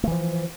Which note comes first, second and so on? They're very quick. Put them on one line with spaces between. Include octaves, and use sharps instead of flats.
A3 E3 F3